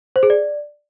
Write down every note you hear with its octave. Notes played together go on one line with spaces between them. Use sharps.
C5
G#4
D5